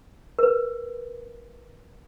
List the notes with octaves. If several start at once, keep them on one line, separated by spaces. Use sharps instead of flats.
A#4 B4